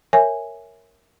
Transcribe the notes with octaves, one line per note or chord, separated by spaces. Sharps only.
A#4 C#5 E5 G#5